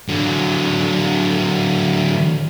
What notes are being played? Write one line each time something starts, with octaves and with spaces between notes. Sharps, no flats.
D3 F#3